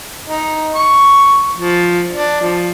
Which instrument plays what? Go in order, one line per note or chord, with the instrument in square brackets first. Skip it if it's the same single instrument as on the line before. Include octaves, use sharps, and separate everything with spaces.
[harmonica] D#4
C#6
F3
D4
F3